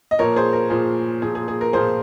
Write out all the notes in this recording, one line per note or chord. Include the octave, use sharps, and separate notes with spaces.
D#5
A#2 F3 A#4 C#5
G#4 C5
A#4
A#2 F3 G#4
A#2 F3 G#4
G#4
G#4
A#4
A#2 F3 G#4 C5